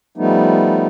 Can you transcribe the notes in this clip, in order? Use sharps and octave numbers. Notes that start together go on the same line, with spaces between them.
F3 G3 A3 B3 D#4